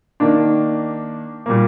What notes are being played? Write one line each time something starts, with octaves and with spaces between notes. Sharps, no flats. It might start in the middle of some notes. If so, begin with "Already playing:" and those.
D#3 A#3 D4
A#2 G3 A#3